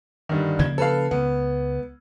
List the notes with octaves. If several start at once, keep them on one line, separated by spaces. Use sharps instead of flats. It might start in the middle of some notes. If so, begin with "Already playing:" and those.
G2 D3 D#3
C#3 F3 A#3 G#6
A4 B4 F5
C#2 B3